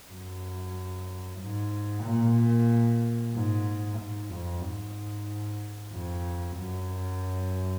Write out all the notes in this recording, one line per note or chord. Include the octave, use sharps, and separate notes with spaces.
F#2
G#2
A#2
G#2
G#2
F2
G#2
F2
F#2